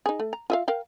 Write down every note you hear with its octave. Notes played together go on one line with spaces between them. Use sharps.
D#4 G#4
A3
A#5
F4 E5 F5
A#4 F5 G5